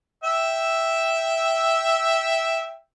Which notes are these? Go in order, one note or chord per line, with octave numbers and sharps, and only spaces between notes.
E5 G5 E6